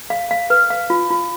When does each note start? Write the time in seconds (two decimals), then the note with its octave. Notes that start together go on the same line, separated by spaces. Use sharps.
0.10 F5
0.31 F5
0.50 B4
0.70 F5
0.90 F4
1.10 F4